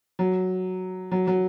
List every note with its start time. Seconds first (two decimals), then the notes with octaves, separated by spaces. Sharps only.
0.19 F#3
1.12 F#3
1.27 F#3